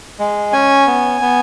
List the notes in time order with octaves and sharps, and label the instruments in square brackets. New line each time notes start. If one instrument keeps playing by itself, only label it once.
[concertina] G#3
C#4 G#5
B3
B3